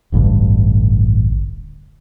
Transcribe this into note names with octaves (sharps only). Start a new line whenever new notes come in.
D1 A1 G2 D3